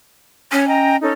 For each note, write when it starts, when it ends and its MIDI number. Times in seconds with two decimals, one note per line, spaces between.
0.51 0.97 61
0.51 0.64 73
0.67 0.96 75
0.67 0.96 79
0.67 0.96 82
1.00 1.11 61
1.00 1.11 63
1.00 1.11 69